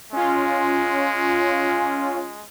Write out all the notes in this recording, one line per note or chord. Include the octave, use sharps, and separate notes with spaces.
G#3 C#4 F4